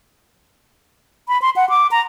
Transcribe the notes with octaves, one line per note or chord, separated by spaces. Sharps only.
B5
C6
F#5
D6
A#5